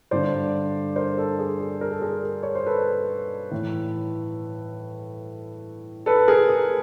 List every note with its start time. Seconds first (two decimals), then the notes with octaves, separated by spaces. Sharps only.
0.11 G2 D3 C5 D5
0.96 A#4 C5
1.18 A4
1.39 G#4
1.60 A4
1.81 A#4
1.91 A4
2.02 G#4 A#4
2.43 C#5
2.55 C5
2.66 A4 B4
3.51 A2 E3
6.06 A4 B4
6.28 G#4 A#4
6.49 G#4